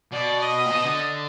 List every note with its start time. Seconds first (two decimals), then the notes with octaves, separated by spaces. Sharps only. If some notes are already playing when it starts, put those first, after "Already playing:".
0.12 B2 D5
0.42 D#5
0.66 A#2
0.71 B2
0.84 D3